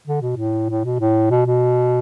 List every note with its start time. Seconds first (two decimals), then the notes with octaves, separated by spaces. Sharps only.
0.07 D3
0.22 B2
0.37 A2
0.69 A2
0.85 B2
1.00 A2
1.31 B2
1.46 B2